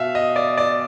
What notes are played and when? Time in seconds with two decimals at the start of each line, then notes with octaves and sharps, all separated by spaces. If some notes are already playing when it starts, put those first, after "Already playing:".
Already playing: B2 E5 F5
0.15 D#5
0.36 D5
0.58 D5